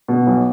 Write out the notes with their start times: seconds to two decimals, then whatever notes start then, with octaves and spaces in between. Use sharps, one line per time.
0.08 B2
0.27 B1